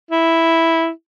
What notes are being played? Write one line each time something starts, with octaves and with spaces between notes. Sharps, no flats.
E4